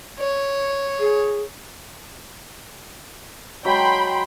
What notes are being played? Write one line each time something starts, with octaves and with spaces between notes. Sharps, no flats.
C#5
G#4
F#3 G#3 G5 B5 C6